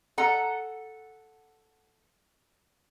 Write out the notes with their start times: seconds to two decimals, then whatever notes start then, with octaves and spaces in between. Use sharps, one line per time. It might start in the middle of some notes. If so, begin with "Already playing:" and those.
0.18 A4 F#5 A#5